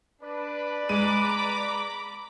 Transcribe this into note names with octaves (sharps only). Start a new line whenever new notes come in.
D4 B4 D5
G#3 A#5 B5 D6 D#7